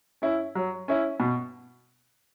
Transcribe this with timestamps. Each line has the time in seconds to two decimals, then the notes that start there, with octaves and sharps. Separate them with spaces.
0.22 C#4 E4
0.55 F#3
0.88 C#4 E4
1.20 B2